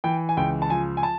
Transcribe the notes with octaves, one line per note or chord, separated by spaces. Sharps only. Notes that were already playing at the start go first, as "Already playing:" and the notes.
E3 G5
G#5
C#2 G5
A5
F3 G#5
G#5
A5